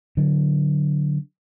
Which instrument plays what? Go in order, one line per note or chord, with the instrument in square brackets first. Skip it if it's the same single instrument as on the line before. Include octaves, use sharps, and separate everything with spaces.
[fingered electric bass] D3 F#3